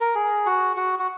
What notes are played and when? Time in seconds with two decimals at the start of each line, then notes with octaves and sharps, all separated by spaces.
0.01 A#4
0.15 G#4
0.46 F#4
0.76 F#4
0.99 F#4